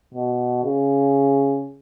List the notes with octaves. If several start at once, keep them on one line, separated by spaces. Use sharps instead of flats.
B2
C#3